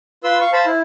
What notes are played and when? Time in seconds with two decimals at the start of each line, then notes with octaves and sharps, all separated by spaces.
0.24 F4 B4 C6 E6
0.41 F5 C#6
0.53 C5 F5 A5 B5
0.66 E4